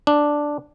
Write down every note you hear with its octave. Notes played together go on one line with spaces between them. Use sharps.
D4